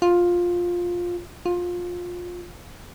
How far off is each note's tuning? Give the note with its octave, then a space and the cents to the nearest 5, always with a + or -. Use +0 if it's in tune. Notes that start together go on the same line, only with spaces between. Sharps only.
F4 +10
F4 +20